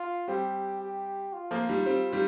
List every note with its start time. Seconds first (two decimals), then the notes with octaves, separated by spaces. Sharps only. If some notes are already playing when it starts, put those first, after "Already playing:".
Already playing: F4
0.28 G3 C4 G4
0.81 G4
1.33 F4
1.51 F3 A#3
1.69 D#3 G3
1.86 G3 C4
2.13 D#3 G3